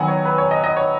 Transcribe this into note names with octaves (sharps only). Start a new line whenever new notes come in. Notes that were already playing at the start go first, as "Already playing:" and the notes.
Already playing: D#3 F#3 B3 F#5 G#5
C#5
B4
C#5
D#5
D#5
C#5